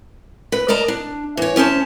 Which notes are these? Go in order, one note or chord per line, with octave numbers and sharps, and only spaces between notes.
B4
A#4 D5 D#5 A5 A#5
D4
E3 C#5
D2 C#4 C5 A5